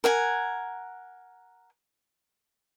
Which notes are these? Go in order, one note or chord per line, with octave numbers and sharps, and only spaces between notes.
A#4 F#5 G#5